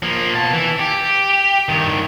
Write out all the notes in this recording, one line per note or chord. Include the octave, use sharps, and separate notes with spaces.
F3 A#3
B2 A5
E3
G4
G2 D#3